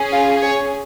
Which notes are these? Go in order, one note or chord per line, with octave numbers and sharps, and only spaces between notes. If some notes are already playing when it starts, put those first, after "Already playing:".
Already playing: C#4 G#4
F4 F5
C#5